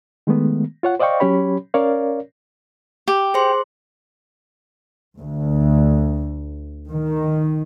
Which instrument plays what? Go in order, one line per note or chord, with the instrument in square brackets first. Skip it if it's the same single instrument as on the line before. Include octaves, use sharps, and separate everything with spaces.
[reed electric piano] D#3 G#3 A3 B3
F4 C#5 F#5
C5 D5 D#5 F5 G5 C#6
F#3 C#4 G4 C#5 B5
C#4 A#4 C#5 D5 F5
[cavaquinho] G4
[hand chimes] G#4 C5 C6
[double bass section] D2
D#3